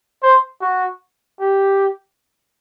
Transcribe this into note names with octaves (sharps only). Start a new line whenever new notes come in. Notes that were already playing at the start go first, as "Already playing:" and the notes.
C5
F#4
G4